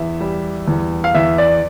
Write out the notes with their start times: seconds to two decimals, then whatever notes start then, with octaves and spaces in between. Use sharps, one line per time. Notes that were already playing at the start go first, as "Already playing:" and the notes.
Already playing: E2 E5
0.20 G3
0.68 E2
1.04 F5
1.15 E2 E5
1.38 D5